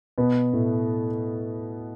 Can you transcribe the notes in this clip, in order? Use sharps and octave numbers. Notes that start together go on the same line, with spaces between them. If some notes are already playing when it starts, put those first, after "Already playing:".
B2 B3
A2 A3